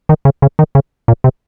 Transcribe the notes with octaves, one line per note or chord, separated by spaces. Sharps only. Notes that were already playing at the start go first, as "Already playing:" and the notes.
D#3
C#3
C#3
D#3
C#3
A#2
C3